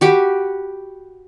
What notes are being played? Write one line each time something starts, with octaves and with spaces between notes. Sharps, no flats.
F#4 G4 B5